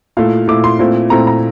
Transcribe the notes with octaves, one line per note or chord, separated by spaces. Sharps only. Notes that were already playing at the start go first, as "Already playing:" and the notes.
A#2 A3 E4 F5
A#2 A3 E4 D6
C6
A#2 A3 C4 E4
A#2 A3 C4 E4 A#5
A#5